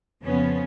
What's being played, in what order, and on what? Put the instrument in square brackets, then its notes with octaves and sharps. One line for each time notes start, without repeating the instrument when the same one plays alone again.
[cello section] F2 C#3 F3 B3 C#4